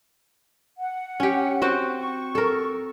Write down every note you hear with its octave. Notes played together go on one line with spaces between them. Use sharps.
F#5
C#4 G4
C4 F#4 C5
C#6
A4 A#4